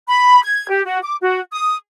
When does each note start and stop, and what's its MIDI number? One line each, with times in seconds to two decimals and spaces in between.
0.08 0.40 83
0.44 0.67 92
0.69 0.83 67
0.85 1.00 66
1.03 1.17 86
1.21 1.41 66
1.52 1.76 87